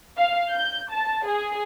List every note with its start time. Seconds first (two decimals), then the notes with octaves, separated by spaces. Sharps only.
0.17 F5
0.52 G6
0.90 A5
1.27 G#4